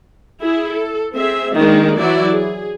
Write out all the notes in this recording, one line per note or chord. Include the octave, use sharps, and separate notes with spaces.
E4 G#4
A4
C4 G#4 E5
D#3 G#3 A#3 D4
E3 F#3 E4 F#4 D5
G#4